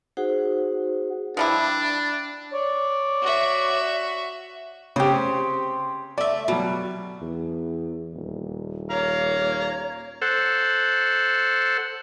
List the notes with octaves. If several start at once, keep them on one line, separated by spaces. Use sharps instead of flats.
D#4 F#4 G#4 C5 F#5
F3 G3 D4 E4
C#5 D5
F#4 E5
C#3 C4 G4 C5
A3 D5 E5
B2 F#3 G3
E2
D#1
C#5 F5 A#5
A4 C5 F#5